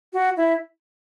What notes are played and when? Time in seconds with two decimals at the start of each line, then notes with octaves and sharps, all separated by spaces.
0.13 F#4
0.37 E4